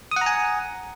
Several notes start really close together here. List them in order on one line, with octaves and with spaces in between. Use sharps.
D#6 F#5 A#5 G#5